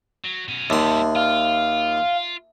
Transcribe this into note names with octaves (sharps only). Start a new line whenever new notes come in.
F#3
B2 C#4
D#2 G3 B3 E5 A5 C6 D6
F4 F5